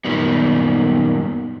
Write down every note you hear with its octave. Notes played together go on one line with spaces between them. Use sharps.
F#2 A#2 D#3 G3 B3